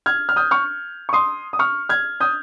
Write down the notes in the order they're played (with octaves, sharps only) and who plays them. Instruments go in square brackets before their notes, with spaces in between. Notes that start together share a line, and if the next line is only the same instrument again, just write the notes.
[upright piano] F6 G#6
F6
D#6 G6
C#6 F6
C#6
C6 D#6
D#6
C#6 F6
F6 G#6
D#6 G6